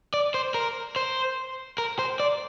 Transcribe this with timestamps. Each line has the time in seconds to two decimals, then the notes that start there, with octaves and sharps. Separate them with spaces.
0.14 D5
0.34 C5
0.54 A#4
0.96 C5
1.78 A#4
1.99 C5
2.20 D5